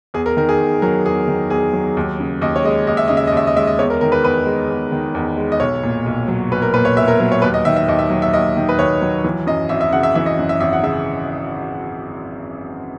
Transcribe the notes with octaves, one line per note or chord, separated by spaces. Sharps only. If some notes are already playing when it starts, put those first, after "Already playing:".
E2 G#4
A#4
D#3 A#4
G#4
E2
F#3 A#4
E2 G#4
D#3
E2 G#4
F#3
D#2
C#3
D#2 D#5
C#5
G#3 D#5
D#2 D#5
E5
C#3 D#5
E5
D#5
D#2 E5
D#5
G#3 E5
D#5
E2 C#5
A#4
D#3 A#4
B4
E2 B4
G#3
E2
D#3
E2
G#3
D#5
B1 C#5
A#2
B1
F#3
B1 B4
A#4
A#2 B4
C#5
B1 E5
A#4
F#3 A#4
C#5
D#2 B4
D#5
D#3 E5
E5
D#2 D#5
E5
F#3
E5
D#2 D#5
D#3
B4
D#2 C#5
F#3
E3
F#2 D#5
G#1 E5
E5
C#3 F#5
E5
E3 E5
D#5
F#2
E5
G#1 E5
F#5
C#3 E5